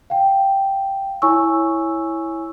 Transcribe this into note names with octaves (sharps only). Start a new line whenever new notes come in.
F5 G5
E4 C#5 G#5 C#6 E6